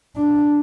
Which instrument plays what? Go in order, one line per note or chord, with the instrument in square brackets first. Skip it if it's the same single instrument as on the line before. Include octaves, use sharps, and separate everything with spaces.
[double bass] D4